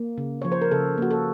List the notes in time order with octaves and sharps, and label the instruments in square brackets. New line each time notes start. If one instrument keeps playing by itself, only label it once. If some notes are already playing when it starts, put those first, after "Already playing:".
Already playing: [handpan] A#3
C#3
F3 C#5
C5
A#4
C#3 A4
A#3 F#4
A4